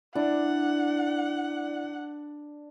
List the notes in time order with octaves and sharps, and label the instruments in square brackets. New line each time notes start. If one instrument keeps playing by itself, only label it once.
[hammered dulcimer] D4 [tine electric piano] E4 D5 [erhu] F#5